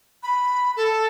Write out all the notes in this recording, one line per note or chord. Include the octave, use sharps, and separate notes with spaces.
B5
A4